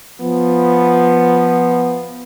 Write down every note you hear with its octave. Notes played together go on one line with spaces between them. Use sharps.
F3 B3